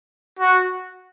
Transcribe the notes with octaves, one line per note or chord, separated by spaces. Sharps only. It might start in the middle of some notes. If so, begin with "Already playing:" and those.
F#4